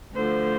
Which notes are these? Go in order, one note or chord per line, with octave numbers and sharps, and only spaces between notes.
D2 D3 F3 C5